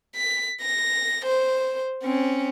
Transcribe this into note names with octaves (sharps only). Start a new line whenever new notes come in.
B6
A#6
C5
C4 C#4